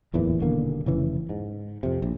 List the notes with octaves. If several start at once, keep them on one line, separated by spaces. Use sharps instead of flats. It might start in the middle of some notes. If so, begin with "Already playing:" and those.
D1 E2 A#2 E3
D#1 B2 D3 A#3
F1 C#3 E3
G#2
F2 C3
A#1